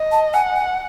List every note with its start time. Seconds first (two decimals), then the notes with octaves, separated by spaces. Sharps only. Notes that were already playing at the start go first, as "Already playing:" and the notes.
Already playing: D#5
0.12 A5
0.33 F#5 G#5
0.56 G#5